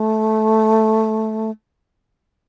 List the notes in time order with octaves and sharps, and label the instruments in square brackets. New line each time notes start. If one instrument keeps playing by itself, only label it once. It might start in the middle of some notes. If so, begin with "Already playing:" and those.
Already playing: [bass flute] A3